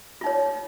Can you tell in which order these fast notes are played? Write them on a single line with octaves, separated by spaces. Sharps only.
F4 D#4 C#5